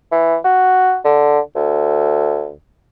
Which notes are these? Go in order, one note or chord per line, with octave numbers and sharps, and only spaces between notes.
E3
F#4
D3
D2